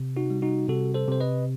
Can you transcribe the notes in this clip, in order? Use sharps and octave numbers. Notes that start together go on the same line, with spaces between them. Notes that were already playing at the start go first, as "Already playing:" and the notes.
Already playing: C3
D#4 F#4
G3
D#4 F#4
C3 F#4 A4
A4 C5
C3 C5
B4 D#5